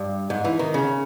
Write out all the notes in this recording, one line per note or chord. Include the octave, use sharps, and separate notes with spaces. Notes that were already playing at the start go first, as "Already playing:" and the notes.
Already playing: G2
G#2
E3
D#3
C#3